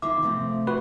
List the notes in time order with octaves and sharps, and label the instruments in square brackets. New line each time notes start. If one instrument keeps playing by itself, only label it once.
[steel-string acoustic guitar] D#2 F4 E5 [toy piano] D6
[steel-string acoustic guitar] C3 F3 C4 [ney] A3
[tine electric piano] F#4 B4